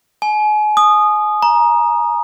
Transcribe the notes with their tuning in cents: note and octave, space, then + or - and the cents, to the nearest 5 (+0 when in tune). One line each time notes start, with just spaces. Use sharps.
G#5 +35
D#6 -15
A#5 +20